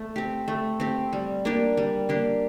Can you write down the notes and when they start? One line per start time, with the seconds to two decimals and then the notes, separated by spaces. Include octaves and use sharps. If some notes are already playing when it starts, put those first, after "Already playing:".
Already playing: A3
0.16 C4 G4
0.48 A3
0.80 C4 G4
1.13 G3
1.45 A#3 D4 G4
1.77 G3
2.09 A#3 D4 G4